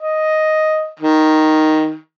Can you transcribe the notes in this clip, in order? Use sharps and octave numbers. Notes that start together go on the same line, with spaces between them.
D#5
D#3